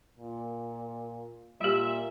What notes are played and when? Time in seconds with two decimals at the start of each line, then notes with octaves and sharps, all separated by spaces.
0.18 A#2
1.61 A#2 G3 G4 E5